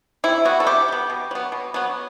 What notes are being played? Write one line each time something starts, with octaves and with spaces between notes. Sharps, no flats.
C3 E4
G3 B3 F#4
A4
C3 G4
G3
B3
B2
F#3 B3
B2
F#3 B3